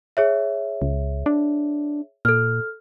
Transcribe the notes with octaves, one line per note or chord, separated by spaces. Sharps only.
G#4 C#5 E5
C#2
D4
A#2 A4 F6